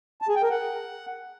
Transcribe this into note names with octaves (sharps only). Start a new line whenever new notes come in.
A5
G#4
G5
A#4
F#5